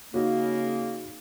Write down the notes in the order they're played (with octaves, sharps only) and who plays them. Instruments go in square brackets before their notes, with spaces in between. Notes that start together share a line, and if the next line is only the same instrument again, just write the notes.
[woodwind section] C#3 A#3 [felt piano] D#4 F#4